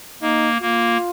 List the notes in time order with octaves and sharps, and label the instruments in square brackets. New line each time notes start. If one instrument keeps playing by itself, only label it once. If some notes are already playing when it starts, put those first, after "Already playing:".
[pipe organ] A#3 [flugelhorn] D#4
[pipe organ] A#3 [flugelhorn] F4